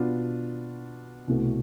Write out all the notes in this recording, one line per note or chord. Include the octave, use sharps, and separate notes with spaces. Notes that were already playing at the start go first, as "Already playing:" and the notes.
Already playing: B2 B3 D4 F4
C2 B2 A3